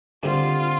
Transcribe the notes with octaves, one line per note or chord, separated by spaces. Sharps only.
D3 G3 C4 F4 G4